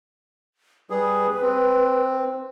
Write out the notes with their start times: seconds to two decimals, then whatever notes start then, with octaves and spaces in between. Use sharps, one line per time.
0.90 G3 G#4 B4
1.42 C4